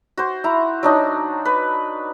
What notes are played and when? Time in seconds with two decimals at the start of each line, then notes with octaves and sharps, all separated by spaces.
0.17 F#4 C5
0.44 E4 A#5
0.83 F#3 D4 D#4
1.45 B4